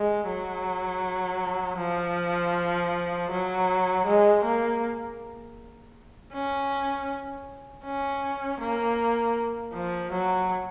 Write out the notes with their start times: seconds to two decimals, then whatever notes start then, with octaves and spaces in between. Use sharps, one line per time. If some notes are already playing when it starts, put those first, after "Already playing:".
Already playing: G#3
0.28 F#3
1.79 F3
3.31 F#3
4.06 G#3
4.44 A#3
6.33 C#4
7.85 C#4
8.61 A#3
9.74 F3
10.12 F#3